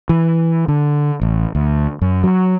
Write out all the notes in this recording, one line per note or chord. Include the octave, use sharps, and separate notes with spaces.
E3
D3
A1
D2
F#2
F#3